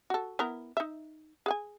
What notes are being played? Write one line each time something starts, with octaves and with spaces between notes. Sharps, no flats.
F#4 A4
B3 E4 A#4
D#4 E5
G#4 F#5 G#5